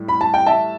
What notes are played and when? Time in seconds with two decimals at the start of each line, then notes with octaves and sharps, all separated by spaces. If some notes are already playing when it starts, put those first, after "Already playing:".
Already playing: A2 G3
0.08 B5
0.21 A5
0.34 G5
0.46 E5 A5